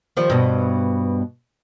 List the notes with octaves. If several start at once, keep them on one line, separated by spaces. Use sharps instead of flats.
D#3 F3 G3
G2 B2